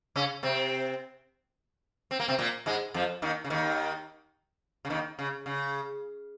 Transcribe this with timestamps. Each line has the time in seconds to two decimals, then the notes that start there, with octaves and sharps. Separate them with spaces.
0.16 C#3 C#4
0.43 C3 C4
2.11 C4
2.20 A#3
2.28 C3 C4
2.39 A#2 A#3
2.66 G#2 G#3
2.94 F2 F3
3.22 D#2 D#3
3.44 C#3
3.50 D#2 D#3
4.85 C#3
4.90 D#2 D#3
5.19 C#3
5.46 C#3